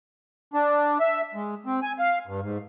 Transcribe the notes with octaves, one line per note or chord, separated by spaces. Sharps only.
D4
E5
G#3
C4
G#5
F5
G2
G#2